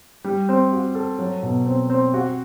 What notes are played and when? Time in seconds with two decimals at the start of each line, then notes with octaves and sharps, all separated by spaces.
0.24 G3
0.49 C4
0.72 F#4
0.95 A4
1.19 F#3
1.43 B2
1.66 C4
1.90 C4
2.14 F#4